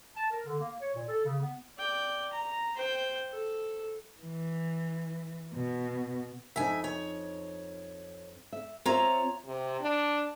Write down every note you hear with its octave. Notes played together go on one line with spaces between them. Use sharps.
A5
A#4
D3
A#3
C#5
A#2
A4
C#3
B3
D5 G5
A#5
C5 G5
A4
E3
B2
F2 D#4 E5 G#5
C#5
E5
C4 F4 C#5 E5 A#5
C3
D4